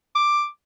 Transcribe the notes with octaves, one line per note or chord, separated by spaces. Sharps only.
D6